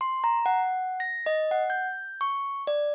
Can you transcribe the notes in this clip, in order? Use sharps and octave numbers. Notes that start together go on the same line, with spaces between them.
C6
A#5
F#5
A#6
D#5
F#5
G6
C#6
D5